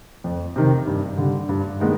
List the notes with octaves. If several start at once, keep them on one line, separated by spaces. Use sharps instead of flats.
F2
C3 D#3
G2
D3 G3
G2
D#3 G#3 B3